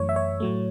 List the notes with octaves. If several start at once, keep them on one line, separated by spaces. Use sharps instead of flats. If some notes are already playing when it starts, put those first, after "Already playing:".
Already playing: F#2 E3 A3 C#5
E5
C#5
A2 F#3 A3